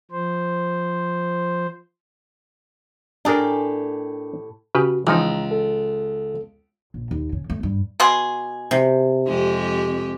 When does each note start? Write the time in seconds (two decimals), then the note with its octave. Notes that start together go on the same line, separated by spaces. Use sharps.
0.11 F3 C5
3.25 A2 D4 G4 G#4 A#4
4.75 C#3 F#4 G4 B4
5.07 C#2 E3 F3 D#4 A#5
5.51 A4
6.94 A#1
7.11 D#2
7.32 C#3
7.50 A3
7.63 G2
8.00 B2 G#4 C6
8.71 C3
9.26 F2 G#3 G4